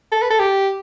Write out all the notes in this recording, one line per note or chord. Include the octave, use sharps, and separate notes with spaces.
A4
B4
A4
G4